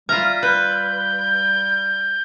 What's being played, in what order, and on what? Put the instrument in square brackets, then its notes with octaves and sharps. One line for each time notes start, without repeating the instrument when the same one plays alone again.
[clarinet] G3 [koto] F4 A#5 [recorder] E5 [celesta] F6
[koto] B4 [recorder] G6